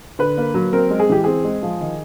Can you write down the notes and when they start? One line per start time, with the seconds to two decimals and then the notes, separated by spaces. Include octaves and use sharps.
0.19 D3 B4
0.38 A#3
0.54 F#3
0.73 C4 A#4
0.90 G#3
1.00 G#4
1.09 E3 G4
1.24 C4 G#4
1.44 G#3
1.63 F3
1.81 D#3